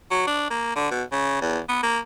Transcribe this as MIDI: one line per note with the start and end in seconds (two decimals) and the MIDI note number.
0.11 0.27 54
0.27 0.48 62
0.51 0.73 58
0.76 0.87 50
0.91 1.04 47
1.12 1.40 49
1.42 1.60 40
1.69 1.82 59
1.83 1.99 58